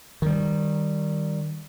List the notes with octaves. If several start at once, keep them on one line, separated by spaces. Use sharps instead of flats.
D#3 G3